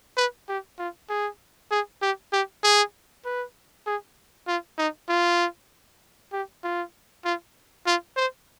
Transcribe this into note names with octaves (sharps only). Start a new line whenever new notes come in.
B4
G4
F4
G#4
G#4
G4
G4
G#4
B4
G#4
F4
D#4
F4
G4
F4
F4
F4
C5